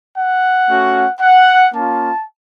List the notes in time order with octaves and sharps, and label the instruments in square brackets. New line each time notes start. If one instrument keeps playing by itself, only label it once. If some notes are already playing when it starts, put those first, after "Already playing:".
[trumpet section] F#5
A3 C#4 F#4
F#5
A#3 C#4 F4 A5